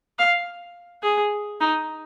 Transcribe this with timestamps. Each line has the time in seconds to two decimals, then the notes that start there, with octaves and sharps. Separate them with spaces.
0.19 F5
1.03 G#4
1.60 D#4